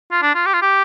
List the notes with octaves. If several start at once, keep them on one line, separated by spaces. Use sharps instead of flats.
F4
D4
F4
G4
F4
G4